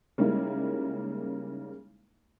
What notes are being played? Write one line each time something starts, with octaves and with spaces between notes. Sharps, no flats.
C#3 G3 G#3 A#3 D#4 E4